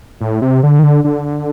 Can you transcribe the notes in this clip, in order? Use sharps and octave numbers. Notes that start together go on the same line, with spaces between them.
A2
C3
D3
D#3
D3
D3